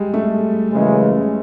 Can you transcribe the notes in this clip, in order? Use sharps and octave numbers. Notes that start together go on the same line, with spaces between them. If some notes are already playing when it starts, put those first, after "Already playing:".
Already playing: G3 G#3
A3
F#2 C#3 E3 G#3